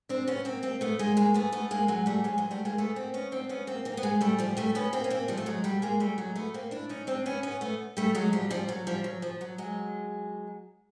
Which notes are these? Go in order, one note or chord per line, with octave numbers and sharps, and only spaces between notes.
C4 D4
B3 C#4
A#3 C4
A#3 C4
A3 B3
G#3 A#3
G#3 A#3
A3 B3
A3 B3
G#3 A#3
F#3 G#3
G3 A3
F#3 G#3
F#3 G#3
G3 A3
G#3 A#3
A3 B3
A#3 C4
B3 C#4
C4 D4
B3 C#4
A#3 C4
A#3 C4
B3
G#3 A#3
G3 A3
F3 G3
G3 A3
B3 C#4
A#3 C4
C#4
A#3 C4
F3 G3
A3
F#3 G#3
G3 A3
G#3 A#3
G3 A3
F#3 G#3
A3 B3
A#3 C4
D4 E4
C#4 D#4
C4 D4
B3 C#4
B3 C#4
A3 B3
G3 A3
F#3 G#3
F3 G3
F3 G3
F#3
F3 G3
F#3
F3
F#3
F#3 G#3